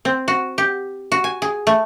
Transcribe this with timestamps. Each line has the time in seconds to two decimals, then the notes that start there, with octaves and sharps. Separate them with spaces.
0.05 C4
0.28 F#4
0.58 G4
1.12 F#4
1.24 G#5
1.42 G#4
1.67 A3